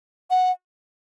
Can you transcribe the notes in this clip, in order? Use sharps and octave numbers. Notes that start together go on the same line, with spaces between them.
F#5